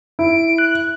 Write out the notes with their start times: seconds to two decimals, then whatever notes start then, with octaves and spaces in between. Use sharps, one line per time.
0.19 E4 D7
0.58 F#6